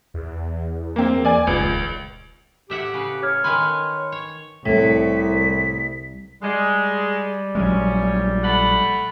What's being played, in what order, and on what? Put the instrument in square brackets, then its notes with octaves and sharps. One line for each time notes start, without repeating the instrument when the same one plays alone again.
[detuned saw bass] E2
[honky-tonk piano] A#3 C4
D5 G#5
[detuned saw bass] D#1 [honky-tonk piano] C#2
[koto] A2 E5 F#5 [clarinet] G4
[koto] C#3 B4
[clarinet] C#5 [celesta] F6 G#6
[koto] D#3 B4 G#5 [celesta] B5 C6 F6
[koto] C#5
[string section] C2 [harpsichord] A2 [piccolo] B6
[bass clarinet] G3 [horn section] G#3
[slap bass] A#1 F#3 G#3 [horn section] C#4
[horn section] A3 F#5 B5